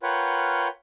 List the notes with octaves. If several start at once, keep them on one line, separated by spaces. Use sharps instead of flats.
F4 A#4 B4 C#5 F#5 G5